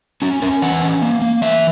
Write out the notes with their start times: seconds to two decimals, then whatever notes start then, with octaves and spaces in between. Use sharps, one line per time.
0.22 C#4 F#4
0.42 C#4 A#4
0.62 E3 F#5
0.82 C#4
1.02 A#3
1.22 A#3
1.41 E3 E5